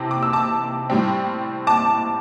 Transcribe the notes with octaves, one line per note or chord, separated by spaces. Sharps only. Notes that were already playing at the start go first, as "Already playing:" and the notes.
Already playing: C3 E3 C4 A5
D6
E6
A5 D6
A2 G3 C4
A5 D6